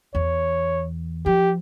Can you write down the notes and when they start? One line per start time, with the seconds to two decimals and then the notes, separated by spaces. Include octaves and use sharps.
0.15 E2 C#5
1.26 F3 G4